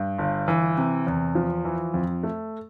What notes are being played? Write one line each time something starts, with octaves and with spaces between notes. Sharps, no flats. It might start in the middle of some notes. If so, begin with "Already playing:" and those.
Already playing: G2
G1
E3
C3
E2
F3
E3
F2
A3